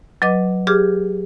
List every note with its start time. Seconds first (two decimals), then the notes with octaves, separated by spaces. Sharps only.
0.22 F#3 B4 D#5 D6
0.67 G4 G#4 D6 F6